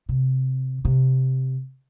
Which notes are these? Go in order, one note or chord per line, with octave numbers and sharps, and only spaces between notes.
C3
C3